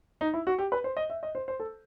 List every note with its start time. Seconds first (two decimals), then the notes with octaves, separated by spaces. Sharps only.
0.21 D#4
0.34 E4
0.47 F#4
0.59 G4
0.72 B4
0.84 C5
0.97 D#5
1.10 E5
1.23 D#5
1.35 C5
1.48 C5
1.60 A4